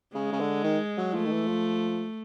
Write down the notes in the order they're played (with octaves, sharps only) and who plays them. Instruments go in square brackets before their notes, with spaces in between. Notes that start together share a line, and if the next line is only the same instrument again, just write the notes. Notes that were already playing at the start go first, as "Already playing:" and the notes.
[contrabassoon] C#3 [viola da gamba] G#3
[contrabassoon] C#3
D3
D#3
F#3
[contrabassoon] F3 [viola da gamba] A3
[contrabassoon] D#3
E3
F3